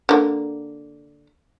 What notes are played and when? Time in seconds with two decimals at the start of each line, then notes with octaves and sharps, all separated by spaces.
0.09 D3 A#3